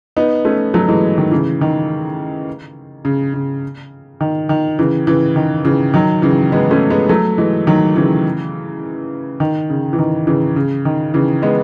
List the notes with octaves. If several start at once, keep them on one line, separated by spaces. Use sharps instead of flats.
B3 D#4
A3 C#4
F#3 A3
E3 G#3
D#3
C#3 E3
D#3
C#3
C#3
D#3
D#3
C#3 E3
C#3 E3
D#3
C#3 E3
D#3 F#3
C#3 E3
G#3 B3
A3 C#4
G#3 B3
F#3 A3
E3 G#3
D#3 F#3
C#3 E3
D#3
C#3
E3
D#3
C#3 E3
C#3
D#3
C#3 E3
G#3 B3